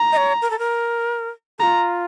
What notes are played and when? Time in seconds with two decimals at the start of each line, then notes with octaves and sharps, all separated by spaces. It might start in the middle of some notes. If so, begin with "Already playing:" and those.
Already playing: A#5
0.12 D#5
0.17 C#5
0.42 A#4
0.50 A4
0.59 A#4
1.59 F4 A4 A#5